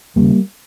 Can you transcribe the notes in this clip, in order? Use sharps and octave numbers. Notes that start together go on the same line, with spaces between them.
D#2 C#3 G3 A#3